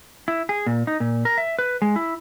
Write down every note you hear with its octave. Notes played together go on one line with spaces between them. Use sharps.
E4
G#4
A#2
D#4
A#2
A#4
E5
B4
G#3
E4